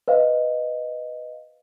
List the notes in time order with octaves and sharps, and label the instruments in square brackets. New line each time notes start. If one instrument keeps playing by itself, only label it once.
[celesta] B4 C5 D#5 F5